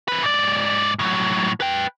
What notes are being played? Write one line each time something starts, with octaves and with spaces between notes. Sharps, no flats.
C4 B4
G#2 D5
A2 F#3
B4 G5